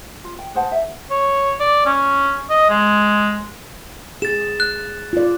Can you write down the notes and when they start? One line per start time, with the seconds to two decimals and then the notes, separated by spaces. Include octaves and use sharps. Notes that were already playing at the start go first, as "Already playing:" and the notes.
0.24 F4
0.39 G5
0.54 G#4 C5 F#5 A5
0.72 E5
1.10 C#5
1.60 D5
1.86 C#4
2.50 D#5
2.70 G#3
4.22 G#4 A6 E7
4.60 F#6
5.13 F4 D5